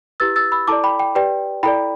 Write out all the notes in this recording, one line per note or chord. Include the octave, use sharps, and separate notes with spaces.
E4 G4 B4 E6 A6
E6 A6
B5 E6
E4 A4 D5 A5 D6
G5 B5
G5
G4 B4 D5 G5
E4 A4 D5 G5 B5